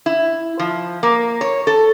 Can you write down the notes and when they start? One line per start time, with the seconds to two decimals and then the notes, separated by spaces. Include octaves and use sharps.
0.06 E4
0.59 F3
1.03 A#3
1.41 C#5
1.67 A4